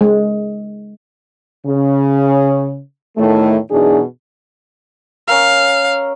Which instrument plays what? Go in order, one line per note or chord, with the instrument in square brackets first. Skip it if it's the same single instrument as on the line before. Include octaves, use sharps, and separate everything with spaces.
[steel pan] G#3
[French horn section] C#3
E2 A2 D#3 A3
F#2 B2 E3 D4 D#4 G#4
[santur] C#4 A#4 E6 [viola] F5